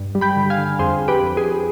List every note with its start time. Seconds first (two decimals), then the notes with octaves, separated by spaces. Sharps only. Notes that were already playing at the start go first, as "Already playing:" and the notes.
Already playing: G2
0.15 G3
0.21 G5 B5
0.36 D3
0.50 F5 G#5
0.58 D3
0.79 F2 G#4 C5
1.00 F2
1.08 G4 B4
1.23 F2
1.37 G#4
1.44 F2